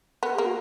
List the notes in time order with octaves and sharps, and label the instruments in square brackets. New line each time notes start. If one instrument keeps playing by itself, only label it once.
[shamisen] B3 [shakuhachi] A#4
[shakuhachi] G#4
[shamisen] A#3 [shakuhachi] F#4